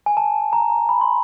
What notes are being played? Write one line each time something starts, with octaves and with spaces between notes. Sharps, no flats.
G#5
A5
A#5
B5
C6